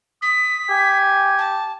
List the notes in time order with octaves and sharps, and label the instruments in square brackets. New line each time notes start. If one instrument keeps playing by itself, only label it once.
[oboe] D#6 [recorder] B6
[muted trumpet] G4 [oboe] G#5
[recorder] A5